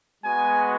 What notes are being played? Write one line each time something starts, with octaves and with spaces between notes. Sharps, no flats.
G#3 B3 F#4 G#5